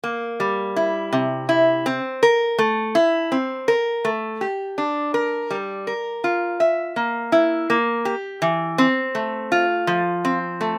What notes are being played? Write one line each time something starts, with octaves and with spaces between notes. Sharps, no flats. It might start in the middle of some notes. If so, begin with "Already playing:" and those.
A#3
G3
E4
C3
E4
C4
A#4
A3
E4
C4
A#4
A3
G4
D4
A#4
G3
A#4
F4
E5
A#3
E4
A#3
G4
E3
C4
A3
F4
F3
C4
A3